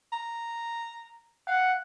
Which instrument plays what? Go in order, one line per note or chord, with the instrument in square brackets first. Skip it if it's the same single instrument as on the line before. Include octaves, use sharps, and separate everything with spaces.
[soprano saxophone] A#5
[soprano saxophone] F5 [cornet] F#5